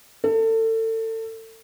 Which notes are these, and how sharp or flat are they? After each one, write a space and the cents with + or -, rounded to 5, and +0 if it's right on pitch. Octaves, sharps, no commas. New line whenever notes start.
A4 +30